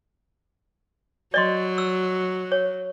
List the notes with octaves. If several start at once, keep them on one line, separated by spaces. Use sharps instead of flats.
F#3 D5 D#5 C6
E6
C#5